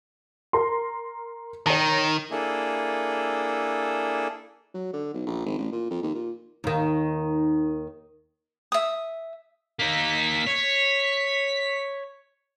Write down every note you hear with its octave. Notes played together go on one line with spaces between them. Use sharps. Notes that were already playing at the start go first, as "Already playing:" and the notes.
A#4 A#5 C6
D#3 C#5 A#5
A#3 D4 E4 G#4 A4
F#3
D3
B1
A#1
G#1
A1
A#2
F2
D#2
A#2
D#2 D#3
E5 D#6
A#3 D#4 B6
C#5